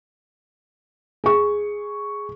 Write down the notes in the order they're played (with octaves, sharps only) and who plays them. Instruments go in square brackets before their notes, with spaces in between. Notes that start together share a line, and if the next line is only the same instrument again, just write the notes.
[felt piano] G#4 C#6